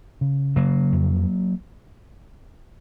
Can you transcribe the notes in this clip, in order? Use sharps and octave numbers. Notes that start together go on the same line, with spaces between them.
C#3
C#3 F#3 A#3
F2